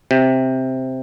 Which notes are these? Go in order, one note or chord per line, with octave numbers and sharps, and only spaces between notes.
C3